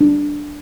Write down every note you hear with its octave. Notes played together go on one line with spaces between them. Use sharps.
D4